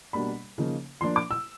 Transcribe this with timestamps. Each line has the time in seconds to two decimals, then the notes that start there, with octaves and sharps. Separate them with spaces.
0.13 B2 G3 A#3 D4 B5
0.58 C#3 F3 A#3 D#4
1.01 F3 A#3 D4 C6
1.16 D6
1.31 E6